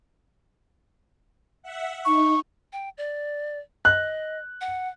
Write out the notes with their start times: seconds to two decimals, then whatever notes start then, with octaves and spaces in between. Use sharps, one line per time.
1.62 E5 F#5
2.05 D#4 C#6
2.73 G5
2.98 D5
3.85 D#5 F#6
4.61 F#5